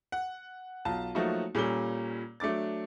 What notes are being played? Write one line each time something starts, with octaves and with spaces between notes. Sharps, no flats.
F#5
B1 F4 A5
F3 F#3 A3 A#3 D#4 F#4
A#2 G3 A#3 C#4 A4 G7
F#3 A3 D4 D6 A6